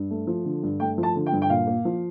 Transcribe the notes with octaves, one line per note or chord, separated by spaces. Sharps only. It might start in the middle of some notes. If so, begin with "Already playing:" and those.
Already playing: G2
A3
F3
D3
G2
A3 G5
F3
A5
D3
G5
G2
G5
A#2 F5
A#3
F3